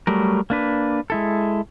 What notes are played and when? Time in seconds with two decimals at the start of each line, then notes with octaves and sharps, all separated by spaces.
0.07 F#3 G3 A3 A#4
0.50 A#3 D4 B4
1.10 G#3 E4 A4